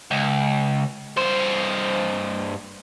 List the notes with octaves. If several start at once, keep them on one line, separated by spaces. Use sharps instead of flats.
C#2
G2 C5